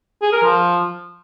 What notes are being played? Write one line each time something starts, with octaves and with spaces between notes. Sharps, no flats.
G#4
A#4
F3